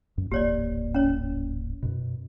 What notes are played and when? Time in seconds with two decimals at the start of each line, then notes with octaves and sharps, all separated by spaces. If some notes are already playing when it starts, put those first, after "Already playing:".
0.18 F#2
0.31 D1 G#1 A#3 G4 C#5 D5
0.95 C#4 C#5
1.83 F#2 B2